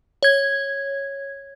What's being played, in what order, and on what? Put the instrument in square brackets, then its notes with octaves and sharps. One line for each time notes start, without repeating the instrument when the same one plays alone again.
[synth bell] C#5 G#6